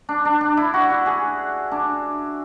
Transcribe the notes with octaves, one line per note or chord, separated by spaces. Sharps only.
D4
D4
D4
E4
F#4
F#4
G#4
D4